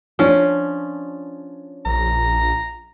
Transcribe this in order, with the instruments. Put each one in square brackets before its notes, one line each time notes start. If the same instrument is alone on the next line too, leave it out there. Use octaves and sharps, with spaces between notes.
[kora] F3 C#4 [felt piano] D4 C#5 D5
[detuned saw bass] A#1 [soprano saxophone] A#5